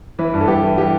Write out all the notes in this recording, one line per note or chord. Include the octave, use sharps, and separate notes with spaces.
E3 B4
G2
A4
E3 G4
E3
E3 G4